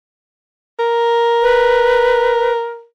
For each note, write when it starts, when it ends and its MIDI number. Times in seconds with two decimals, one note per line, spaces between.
0.79 2.84 70
1.42 2.53 71